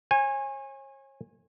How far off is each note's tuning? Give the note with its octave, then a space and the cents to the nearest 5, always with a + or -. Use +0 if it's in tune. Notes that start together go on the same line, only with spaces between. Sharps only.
C#5 -40 G#5 -20